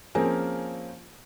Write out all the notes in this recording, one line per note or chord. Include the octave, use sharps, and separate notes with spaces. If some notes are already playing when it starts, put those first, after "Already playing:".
F3 A#3 C4 C#4 G#4 A#4